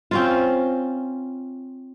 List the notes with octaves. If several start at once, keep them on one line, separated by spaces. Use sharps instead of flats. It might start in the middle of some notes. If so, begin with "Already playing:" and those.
C4 C#4 F4